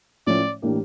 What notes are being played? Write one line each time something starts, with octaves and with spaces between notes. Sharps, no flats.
A2 F3 A3 C#4 D5
A2 E3 A#3 D4 G4